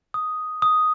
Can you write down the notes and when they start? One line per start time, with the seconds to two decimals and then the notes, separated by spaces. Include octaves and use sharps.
0.14 D#6
0.62 D#6